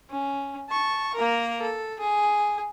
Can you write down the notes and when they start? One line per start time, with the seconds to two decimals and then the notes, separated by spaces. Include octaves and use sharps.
0.10 C#4
0.69 A5 C#6
1.15 A#3 A#4
1.62 A4
1.99 G#4